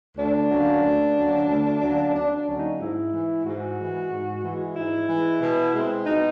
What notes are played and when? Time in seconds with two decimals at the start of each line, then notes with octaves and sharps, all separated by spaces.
0.17 D2 D4
0.51 D3 F#3 A#3 C#4
0.83 D2
1.16 D3 F#3 A#3 C#4
1.48 D2
1.81 D3 F#3 A#3 C#4
2.14 D2 D4
2.36 D4
2.47 D3 F#3 A#3 C#4
2.57 D#4
2.80 G#2 E4
3.13 E3 G#3
3.45 G#2 F#4
3.77 E3 G#3
4.10 G#2
4.44 E3 G#3
4.75 G#2 E4
5.08 E3 G#3
5.41 B2
5.74 G#3 C4
6.07 B2 D#4